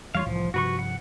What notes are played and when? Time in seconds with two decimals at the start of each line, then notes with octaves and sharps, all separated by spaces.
0.15 F2 E3 G3 F4 C#5 F5
0.26 C2 A2 E3 F3
0.54 G2 C3 F3 F#4 B4 C#6
0.79 F#5